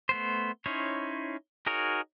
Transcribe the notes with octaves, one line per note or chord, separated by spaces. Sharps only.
A3 B3 C5
C#4 D#4 E4 C5 C#5
D#4 F#4 G#4 A#4 C#5